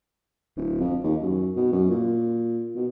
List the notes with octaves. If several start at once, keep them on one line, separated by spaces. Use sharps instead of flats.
D1
F2
D#2
F#2
B2
F#2
A#2
B2